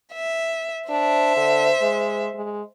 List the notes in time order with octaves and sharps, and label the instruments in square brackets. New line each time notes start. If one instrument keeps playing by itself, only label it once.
[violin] E5
[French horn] D4 [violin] C5 E5
[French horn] D3
G#3
G#3